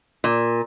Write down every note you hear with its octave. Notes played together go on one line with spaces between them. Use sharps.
A#2